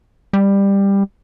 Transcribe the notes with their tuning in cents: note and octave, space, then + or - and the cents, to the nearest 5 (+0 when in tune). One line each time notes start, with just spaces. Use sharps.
G3 +15